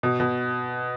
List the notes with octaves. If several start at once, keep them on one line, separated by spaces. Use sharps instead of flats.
B2
B2